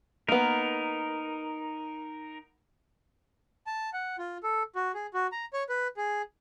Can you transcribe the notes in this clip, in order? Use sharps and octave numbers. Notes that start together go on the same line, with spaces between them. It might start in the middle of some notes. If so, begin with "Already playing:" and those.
A#3 B3 D#4 A#4
A5
F#5
F4
A4
F#4
G#4
F#4
A#5
C#5
B4
G#4